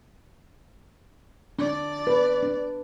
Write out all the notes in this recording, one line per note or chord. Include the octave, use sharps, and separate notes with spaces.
D4 D5
B4
D4